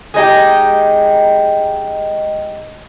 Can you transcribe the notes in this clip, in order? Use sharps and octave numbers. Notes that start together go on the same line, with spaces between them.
G#3 D#4 G4